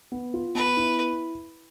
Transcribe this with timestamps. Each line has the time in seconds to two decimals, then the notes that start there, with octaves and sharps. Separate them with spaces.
0.12 B3
0.34 F4
0.55 B3 B4
0.77 E4